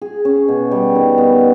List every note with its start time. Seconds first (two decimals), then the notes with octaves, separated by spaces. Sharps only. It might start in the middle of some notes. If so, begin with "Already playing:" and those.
0.02 G#4
0.25 C#4
0.48 B2
0.71 G3
0.95 D#3
1.18 B3